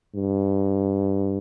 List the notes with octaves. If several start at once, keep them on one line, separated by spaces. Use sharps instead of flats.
G2